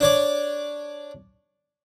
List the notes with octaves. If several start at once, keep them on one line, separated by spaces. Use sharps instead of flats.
D4 C#5 D5